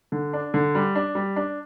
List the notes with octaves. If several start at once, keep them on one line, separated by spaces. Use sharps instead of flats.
D3
D4
D3
G3
D4
G3
D4